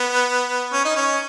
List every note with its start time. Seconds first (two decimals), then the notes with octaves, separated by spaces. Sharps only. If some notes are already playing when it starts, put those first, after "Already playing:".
Already playing: B3
0.73 C#4
0.85 D#4
0.96 C#4